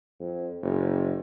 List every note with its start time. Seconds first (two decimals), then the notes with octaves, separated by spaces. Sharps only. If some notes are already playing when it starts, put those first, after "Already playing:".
0.20 F2
0.62 F#1